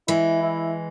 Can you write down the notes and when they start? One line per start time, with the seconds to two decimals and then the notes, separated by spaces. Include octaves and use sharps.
0.08 E3 G#3 E4
0.43 E4